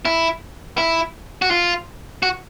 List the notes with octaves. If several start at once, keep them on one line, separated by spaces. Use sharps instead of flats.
E4
E4
F#4
F4
F#4